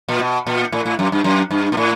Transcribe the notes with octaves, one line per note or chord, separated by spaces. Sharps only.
A#2
B2
A#2
A2
A2
F#2
G2
F#2
G2
A#2
A2